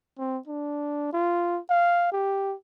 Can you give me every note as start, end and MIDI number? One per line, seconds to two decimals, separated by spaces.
0.18 0.38 60
0.47 1.11 62
1.13 1.59 65
1.70 2.10 77
2.12 2.55 67